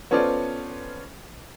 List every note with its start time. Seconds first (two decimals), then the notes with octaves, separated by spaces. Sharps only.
0.11 B3 C#4 F4 A4 C5 D5